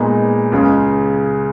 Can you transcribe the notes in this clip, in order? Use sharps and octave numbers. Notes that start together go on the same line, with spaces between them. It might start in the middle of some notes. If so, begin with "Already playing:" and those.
Already playing: A#2 G#3 B3 D#4
C#2 C#3 G#3 C#4